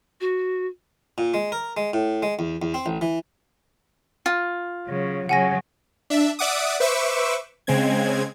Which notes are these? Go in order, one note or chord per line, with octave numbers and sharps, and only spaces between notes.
F#4
A#2
G#3
A#4
G#3
A2
G#3
E2
E2
C4
A1
E3
F4
C#3 F#3
C#3 F#3 F#5 G#5 A#6
D4 E5
D5 E5 F#5 D6 D#6
B4 C5 E5 C#6 D6 E6
C#3 G#3 C4 G#6